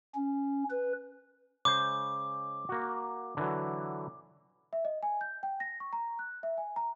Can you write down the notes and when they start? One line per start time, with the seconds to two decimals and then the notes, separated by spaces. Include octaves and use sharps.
0.15 C#4
0.70 B4
1.65 C#3 G#3 C5 D6
2.69 A#3 F#4
3.37 D3 E3 F#3
4.73 E5
4.85 D#5
5.03 G#5
5.21 G6
5.43 G5
5.60 A#6
5.80 C#6
5.93 A#5
6.19 F#6
6.43 E5
6.58 G#5
6.76 A#5